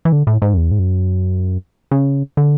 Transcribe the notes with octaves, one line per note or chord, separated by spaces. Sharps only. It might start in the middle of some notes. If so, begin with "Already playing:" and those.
E3
D3
A2
G#2
F#2
E2
G#2
F#2
C#3
D3